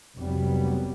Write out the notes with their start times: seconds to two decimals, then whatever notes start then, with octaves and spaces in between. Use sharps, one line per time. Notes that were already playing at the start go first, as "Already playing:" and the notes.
0.19 F1 C2 F#3 G3 B3